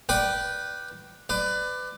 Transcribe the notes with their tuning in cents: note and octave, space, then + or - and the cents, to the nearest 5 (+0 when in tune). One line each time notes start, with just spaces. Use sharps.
B4 -10 D5 +10 G5 -20
B4 +25 D5 +15